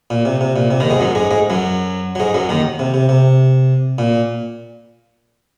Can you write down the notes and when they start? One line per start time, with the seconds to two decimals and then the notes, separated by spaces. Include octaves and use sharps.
0.10 A#2
0.25 C3
0.41 C3
0.56 A#2
0.71 C3
0.80 D#2 D#3
0.90 G#2 G#3
1.00 F#2 F#3
1.15 G#2 G#3
1.31 G#2 G#3
1.50 F#2 F#3
2.15 F#3
2.20 G#2 G#3
2.34 F#2 F#3
2.49 D#2 D#3
2.79 C3
2.94 C3
3.09 C3
3.98 A#2